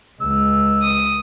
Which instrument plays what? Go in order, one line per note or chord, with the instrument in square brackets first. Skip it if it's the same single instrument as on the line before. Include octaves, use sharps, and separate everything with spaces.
[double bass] C#2 G#3 [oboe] E6
[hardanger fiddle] D#6